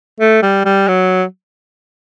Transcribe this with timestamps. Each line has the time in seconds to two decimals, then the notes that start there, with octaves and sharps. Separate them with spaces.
0.20 A3
0.42 G3
0.65 G3
0.88 F#3